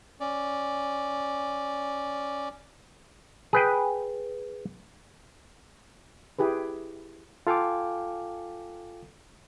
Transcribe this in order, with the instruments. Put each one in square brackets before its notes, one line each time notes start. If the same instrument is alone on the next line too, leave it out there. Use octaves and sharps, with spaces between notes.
[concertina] C#4 D5
[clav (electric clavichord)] G#4 B4 G5
[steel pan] E4 G4 G#4 B4
[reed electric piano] F4 A4 F5 G5 G#5 D6